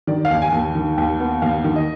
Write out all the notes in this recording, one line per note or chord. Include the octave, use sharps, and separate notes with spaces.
D#3 D5
F5
D#2
G#5
D#2
D#3
D#2
B3
D#2 F5
D#3
D#5